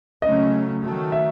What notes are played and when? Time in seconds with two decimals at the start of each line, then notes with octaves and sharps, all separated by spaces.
0.22 C#3 F#3 A3 C#4 D#5
0.82 D#3 F#3 A3
1.12 E5